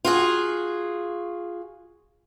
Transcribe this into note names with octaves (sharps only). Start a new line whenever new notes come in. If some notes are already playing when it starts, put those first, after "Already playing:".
F4 F#4 G#4